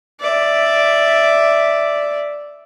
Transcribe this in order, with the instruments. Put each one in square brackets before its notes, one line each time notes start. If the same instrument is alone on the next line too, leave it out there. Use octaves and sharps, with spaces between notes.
[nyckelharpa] D5 E5